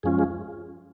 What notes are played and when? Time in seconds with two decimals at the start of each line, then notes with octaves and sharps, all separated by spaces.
0.03 F#2 F3 G#3 C#4 F4 G#4
0.19 G#4